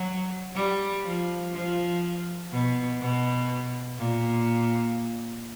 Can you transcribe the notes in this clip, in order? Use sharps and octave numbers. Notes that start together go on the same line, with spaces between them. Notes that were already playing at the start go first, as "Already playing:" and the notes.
Already playing: F#3
G3
F3
F3
B2
B2
A#2